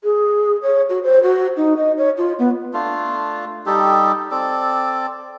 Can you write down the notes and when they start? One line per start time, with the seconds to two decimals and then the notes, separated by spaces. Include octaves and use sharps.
0.04 G#4
0.62 C#5
0.89 F#4
1.03 C5
1.23 F#4
1.57 D#4
1.77 D#5
1.98 C#5
2.17 F4
2.39 B3
2.74 A3 D4 F4
3.66 G3 D#4 G4 A4
4.31 C4 A4 D5